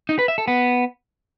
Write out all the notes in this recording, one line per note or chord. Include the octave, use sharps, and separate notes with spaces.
D#4
B4
E5
A4
B3